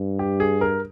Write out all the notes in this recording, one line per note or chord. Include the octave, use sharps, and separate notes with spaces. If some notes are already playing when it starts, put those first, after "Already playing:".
Already playing: G2
G4
G#4
A#4